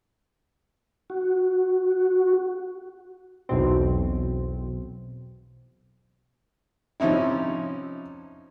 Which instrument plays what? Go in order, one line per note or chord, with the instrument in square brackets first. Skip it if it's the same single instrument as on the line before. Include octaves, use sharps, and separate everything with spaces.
[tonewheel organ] F#4
[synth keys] B1 E2 B2 C4
[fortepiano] C3 F3 C#4 D#4 E4